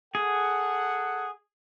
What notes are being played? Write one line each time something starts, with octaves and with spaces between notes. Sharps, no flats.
G#4 A4 F#5